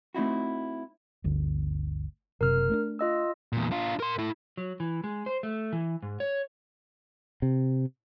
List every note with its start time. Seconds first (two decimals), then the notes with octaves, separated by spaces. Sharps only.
0.14 A3 C4 D#4 E4 F#4
1.24 G1 D2 D3
2.41 F#1 C3 A#4 F6
2.70 A3 C4 D4
2.99 F4 D#5 E6
3.53 E2 A#2
3.71 D4 F4
4.00 A#4 C6
4.19 E4 A4
4.58 F#3
4.80 E3
5.04 G#3
5.26 C5
5.43 A3
5.73 E3
6.03 G#2
6.20 C#5
7.42 C3